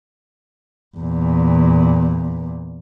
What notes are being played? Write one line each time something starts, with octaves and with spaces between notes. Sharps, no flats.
E2 A#2